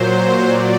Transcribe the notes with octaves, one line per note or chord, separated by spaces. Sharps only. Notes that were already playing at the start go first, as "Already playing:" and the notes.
Already playing: A#2 F#3 C5
D5